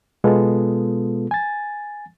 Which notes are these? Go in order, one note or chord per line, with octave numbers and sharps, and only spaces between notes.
B2 G#3 B3 F4 A4
G#5 A6